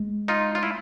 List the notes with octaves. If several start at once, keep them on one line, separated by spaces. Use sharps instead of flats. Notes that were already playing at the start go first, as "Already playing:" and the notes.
Already playing: G#3
D#4 F4
F4
E4